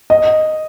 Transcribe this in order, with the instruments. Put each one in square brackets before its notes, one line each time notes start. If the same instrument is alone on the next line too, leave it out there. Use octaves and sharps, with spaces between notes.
[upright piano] D#5